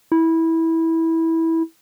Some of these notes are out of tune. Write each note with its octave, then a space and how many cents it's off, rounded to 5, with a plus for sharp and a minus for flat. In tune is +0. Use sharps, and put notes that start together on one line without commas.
E4 -15